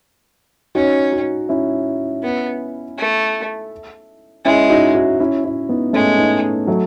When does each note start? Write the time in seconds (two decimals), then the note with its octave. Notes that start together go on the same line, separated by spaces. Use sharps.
0.75 C#4 D#4 F#4
1.12 D#4 F#4
1.49 C#4 E4
2.23 B3
2.98 A3
4.45 G#3 C#4 E4
4.70 D#4 F#4
4.95 D#4 F#4
5.20 C#4 E4
5.44 C#4 E4
5.69 B3 D#4
5.93 G#3 A3 C#4
6.18 B3 D#4
6.67 F#3 A3